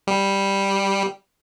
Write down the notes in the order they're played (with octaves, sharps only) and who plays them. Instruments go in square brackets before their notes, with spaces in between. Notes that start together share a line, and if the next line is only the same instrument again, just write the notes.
[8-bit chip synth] G3